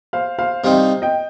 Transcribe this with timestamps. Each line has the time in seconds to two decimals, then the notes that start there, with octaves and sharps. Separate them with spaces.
0.13 C5 F5
0.39 C5 F5
0.64 C3 G3 C4 D#4 C5 F5
1.02 D#5 G5